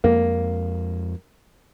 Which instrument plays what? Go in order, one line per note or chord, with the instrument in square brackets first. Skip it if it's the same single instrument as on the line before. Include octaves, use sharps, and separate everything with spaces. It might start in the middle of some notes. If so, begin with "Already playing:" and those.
[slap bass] F2 G#3 [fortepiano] A#3